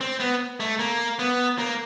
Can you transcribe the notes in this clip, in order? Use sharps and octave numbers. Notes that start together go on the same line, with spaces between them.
C4
B3
A3
A#3
B3
A#3